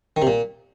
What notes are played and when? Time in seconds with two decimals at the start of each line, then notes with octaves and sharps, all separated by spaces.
0.16 D#3
0.22 C3
0.27 A#2